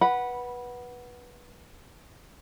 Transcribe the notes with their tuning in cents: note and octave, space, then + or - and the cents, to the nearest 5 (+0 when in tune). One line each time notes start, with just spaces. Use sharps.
B4 -15 F#5 +0 B5 +0